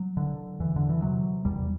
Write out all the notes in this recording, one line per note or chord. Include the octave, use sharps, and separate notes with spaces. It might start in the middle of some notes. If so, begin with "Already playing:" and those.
Already playing: F#3
D3
E2 E3
D3
E3
C3 F#3
E2 G3